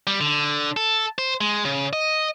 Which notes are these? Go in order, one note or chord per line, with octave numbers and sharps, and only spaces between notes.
G3
D3
A4
C5
G#3
C#3
D#5